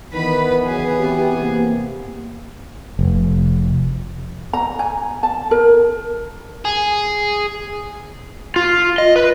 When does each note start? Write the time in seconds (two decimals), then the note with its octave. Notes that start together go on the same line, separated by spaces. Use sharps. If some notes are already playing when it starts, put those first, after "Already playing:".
0.12 D#3 E3 B3 B4 B5
0.65 C#3 F#3 G#4
0.99 C4 G4
1.40 C3 A#3
2.99 F1
4.53 A#5
4.79 G#5
5.23 A5
5.51 A#4
6.65 G#4
8.56 F4
8.98 D#5
9.16 B4